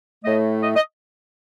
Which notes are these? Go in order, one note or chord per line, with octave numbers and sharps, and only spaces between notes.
A2 A3 D#5
D#5
D#5